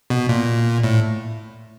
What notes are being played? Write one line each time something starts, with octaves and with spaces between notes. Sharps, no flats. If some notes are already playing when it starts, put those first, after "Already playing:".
B2
A#2
A2